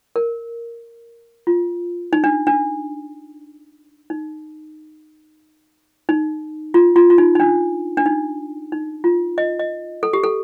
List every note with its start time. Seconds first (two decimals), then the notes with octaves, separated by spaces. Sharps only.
0.16 A#4
1.47 F4
2.13 D#4
2.24 D4
2.47 D4
4.10 D#4
6.09 D#4
6.74 F4
6.96 F4
7.10 F4
7.18 D#4
7.35 D#4
7.40 D4
7.97 D4
8.06 D#4
8.72 D#4
9.04 F4
9.38 D#5
9.59 D#5
10.03 A4
10.13 G4
10.24 A4